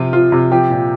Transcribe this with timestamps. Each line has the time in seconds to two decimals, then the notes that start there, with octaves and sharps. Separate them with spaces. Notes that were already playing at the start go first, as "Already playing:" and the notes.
Already playing: C3 F3 F4
0.13 F3 F4
0.32 C3
0.51 F3 G4
0.70 A#2